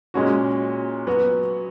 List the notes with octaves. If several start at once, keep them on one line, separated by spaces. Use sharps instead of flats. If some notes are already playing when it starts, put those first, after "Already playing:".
A#2 G#3 C#4 F#4
F#3 B3 F#4